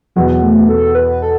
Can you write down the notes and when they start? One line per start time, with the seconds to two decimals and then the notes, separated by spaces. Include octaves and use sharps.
0.16 E2 B2 F#3 B3
0.43 A3
0.69 A4
0.95 B4
1.22 A4